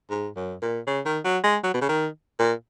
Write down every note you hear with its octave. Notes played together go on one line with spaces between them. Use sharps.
G#2
F#2
A#2
C#3
D#3
F#3
G#3
F#3
B2
C#3
D#3
A#2